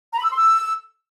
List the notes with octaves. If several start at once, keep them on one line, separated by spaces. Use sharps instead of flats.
A#5
B5
E6
C6
E6